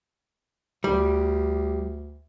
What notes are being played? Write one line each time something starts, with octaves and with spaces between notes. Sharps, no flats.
D2 G3